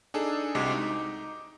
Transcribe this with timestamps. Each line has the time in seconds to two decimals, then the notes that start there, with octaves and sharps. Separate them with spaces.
0.14 D4 D#4 G#4 A4
0.55 C2 C3 G#3 F#4 D6
0.73 D#4